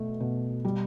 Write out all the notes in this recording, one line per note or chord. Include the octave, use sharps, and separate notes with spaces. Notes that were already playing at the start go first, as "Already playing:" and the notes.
Already playing: B2 A3
B2
G3